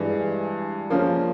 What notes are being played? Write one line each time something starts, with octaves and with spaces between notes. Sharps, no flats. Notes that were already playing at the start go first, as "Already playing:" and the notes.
Already playing: G2 E3 G#3
C#3 F3 A#3 C#4 F4